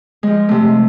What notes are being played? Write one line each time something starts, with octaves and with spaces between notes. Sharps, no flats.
F3 G#3
C3 A3